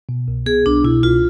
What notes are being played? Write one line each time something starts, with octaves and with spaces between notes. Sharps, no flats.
B2
C2
B3 G#4
C2 D4
B2 E4
C2 F4